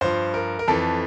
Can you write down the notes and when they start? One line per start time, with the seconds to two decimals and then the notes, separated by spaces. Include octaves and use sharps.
0.01 G2 F3 C5
0.34 A#4
0.59 A#4
0.68 F2 E3 A4